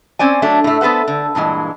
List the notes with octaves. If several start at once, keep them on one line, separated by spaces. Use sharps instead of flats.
C4 C#4 C5 D5 G#5
F#3 A3 D4
A2 A3
B3 A4 B4 C5 F#5
D3
G2 A#2 E3 G#3